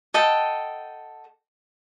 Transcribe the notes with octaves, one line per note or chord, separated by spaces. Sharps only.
A4 D#5 F#5 G5